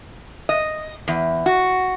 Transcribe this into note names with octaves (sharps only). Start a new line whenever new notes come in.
D#5
E2
F#4